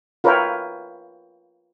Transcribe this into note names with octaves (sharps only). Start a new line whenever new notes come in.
F4 A#4 B4 C#5 E5 G5